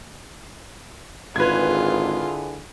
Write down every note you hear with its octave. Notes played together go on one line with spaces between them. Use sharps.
G#1 D3 E4 F4 G#4 B4 G#6